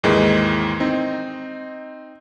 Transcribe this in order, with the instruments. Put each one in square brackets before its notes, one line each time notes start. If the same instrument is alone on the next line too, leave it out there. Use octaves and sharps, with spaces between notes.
[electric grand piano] D#2 G#2 D#3 E3 G#3 A#3
C4 D#4